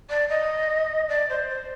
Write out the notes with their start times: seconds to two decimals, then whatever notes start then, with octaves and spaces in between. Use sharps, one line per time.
0.09 D5
0.29 D#5
1.09 D5
1.29 C5
1.49 C5